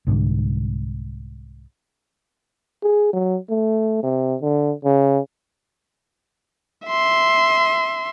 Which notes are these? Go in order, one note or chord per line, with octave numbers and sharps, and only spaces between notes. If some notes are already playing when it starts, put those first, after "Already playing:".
C2 G#2 D3
G#4
F#3
A3
C3
D3
C#3
E5 C6